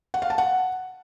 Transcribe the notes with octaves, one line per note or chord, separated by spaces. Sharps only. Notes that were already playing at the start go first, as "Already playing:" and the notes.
F#5
F5
A5
F#5